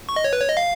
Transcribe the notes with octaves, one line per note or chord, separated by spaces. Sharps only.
C#6
D#5
C#5
B4
C#5
D#5
F5